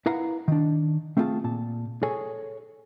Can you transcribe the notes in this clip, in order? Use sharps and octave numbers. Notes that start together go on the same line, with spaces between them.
E4 A#4 B4 F5 F#5 A#5
D#3 D4
A3 C4 E4 F4 G#4 A5
A#2 A5
G#4 A4 C#5 G#5